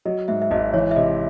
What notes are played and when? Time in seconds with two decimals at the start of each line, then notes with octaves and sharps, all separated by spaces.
0.05 F#3 D#5
0.28 G#2 E5
0.42 E5
0.51 G#1 D#5
0.74 E3 C#5
0.91 E5
0.96 C3 D#5